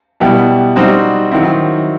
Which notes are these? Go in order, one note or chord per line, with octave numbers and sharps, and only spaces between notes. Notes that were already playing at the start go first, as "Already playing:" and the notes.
B2 G3 B3 E4 G4
G3 C4 D#4 F#4 C5
D#3 F#3 C4 E4